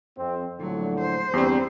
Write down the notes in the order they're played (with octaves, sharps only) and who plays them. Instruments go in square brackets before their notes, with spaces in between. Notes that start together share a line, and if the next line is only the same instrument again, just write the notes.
[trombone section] F2 C4
[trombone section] A#1 A2 D3 [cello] F#3
[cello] C5
[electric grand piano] E2 C4 [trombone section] G2 G3